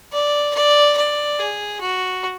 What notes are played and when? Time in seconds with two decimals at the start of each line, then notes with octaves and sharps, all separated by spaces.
0.13 D5
0.54 D5
0.97 D5
1.39 G#4
1.80 F#4